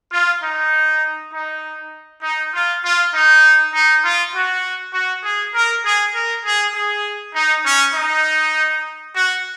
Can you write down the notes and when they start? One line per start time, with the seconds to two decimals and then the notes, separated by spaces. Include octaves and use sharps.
0.12 F4
0.43 D#4
1.33 D#4
2.23 D#4
2.54 F4
2.84 F4
3.14 D#4
3.74 D#4
4.04 F4
4.34 F#4
4.94 F#4
5.25 G#4
5.54 A#4
5.84 G#4
6.14 A#4
6.45 G#4
6.75 G#4
7.35 D#4
7.65 C#4
7.94 D#4
9.15 F#4